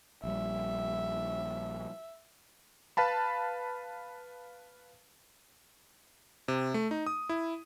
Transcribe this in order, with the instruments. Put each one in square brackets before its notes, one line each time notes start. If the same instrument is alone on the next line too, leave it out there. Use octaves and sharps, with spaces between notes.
[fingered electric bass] A#1 G3 [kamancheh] E5
[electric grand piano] B4 F5 A5 B5
C3
A3
D#4
D#6
E4